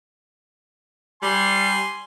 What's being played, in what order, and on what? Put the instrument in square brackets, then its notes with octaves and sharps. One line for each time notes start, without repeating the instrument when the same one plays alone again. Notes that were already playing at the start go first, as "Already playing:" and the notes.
[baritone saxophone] G3 [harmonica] G#5 C6